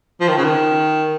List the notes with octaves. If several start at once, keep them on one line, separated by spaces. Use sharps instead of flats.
F3
D#3
C#3
D#3